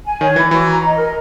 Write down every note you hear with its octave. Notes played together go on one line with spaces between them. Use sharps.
G#5
D#3 C#5
E3 B5
E3 F#4
A#5
D#5
A#4